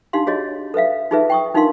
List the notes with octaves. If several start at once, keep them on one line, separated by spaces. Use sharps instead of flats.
D4 D#4 G4 F5 C6
F#4 G#4 C#5 D#5
A4 B4 E5 F5
D#4 F4 G#4 A4 B4 E5
G5 C#6 D#6
D4 D#4 F4 A#4 F5 C6